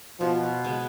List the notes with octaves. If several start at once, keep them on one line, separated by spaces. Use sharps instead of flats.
B2 F3
G#3 B3